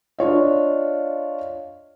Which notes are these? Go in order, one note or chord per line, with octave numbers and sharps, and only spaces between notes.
D4 F4 C#5 D#5